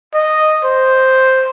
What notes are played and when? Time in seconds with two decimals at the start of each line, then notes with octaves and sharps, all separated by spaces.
0.14 D#5
0.64 C5